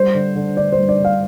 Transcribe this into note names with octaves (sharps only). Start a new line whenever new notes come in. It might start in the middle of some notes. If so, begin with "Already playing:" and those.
Already playing: G3 C5
D3
D3
D3 D5
C5
G3
D5
D3 F5